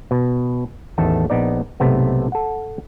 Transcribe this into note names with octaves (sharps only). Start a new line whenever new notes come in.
B2
A1 E2 D#3 A3 A4 A5
A#1 B3 D#4 D5
B1 G#2 C3 A3 B3
A4 F#5